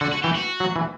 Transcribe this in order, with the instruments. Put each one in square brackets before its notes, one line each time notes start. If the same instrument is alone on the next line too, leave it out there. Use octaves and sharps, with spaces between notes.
[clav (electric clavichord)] D3 [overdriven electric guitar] F#4
[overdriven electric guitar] F#4
[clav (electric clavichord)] E3 [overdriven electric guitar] G4
[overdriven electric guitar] F#4
[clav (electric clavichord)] F#3
E3